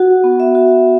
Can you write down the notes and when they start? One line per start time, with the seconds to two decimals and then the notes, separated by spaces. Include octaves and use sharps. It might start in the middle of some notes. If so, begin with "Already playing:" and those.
Already playing: F#4 F#5
0.24 B3
0.40 E5
0.55 F#4